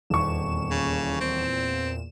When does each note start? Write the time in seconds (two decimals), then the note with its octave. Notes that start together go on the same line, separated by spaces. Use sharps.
0.10 D#1 E2 A#2 C#6 E7
0.71 C#3
1.21 C4